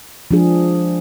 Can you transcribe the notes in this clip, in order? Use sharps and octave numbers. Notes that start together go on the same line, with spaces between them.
F3 G#3 D4 G#4